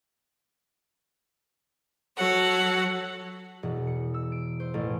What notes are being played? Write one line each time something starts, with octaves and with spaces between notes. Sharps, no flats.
F#3 F#4 A4 C#5 F#5
E1
C#7
E6
D7
C5
A1